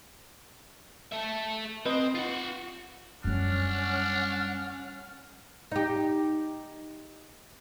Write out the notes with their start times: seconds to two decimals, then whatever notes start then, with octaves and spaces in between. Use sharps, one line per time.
1.12 A4 E5
1.86 C4 B4 D#5
2.15 F4 F#5
3.24 F#2 G3 C#4 D4 F#5 F6
5.72 D#4 G4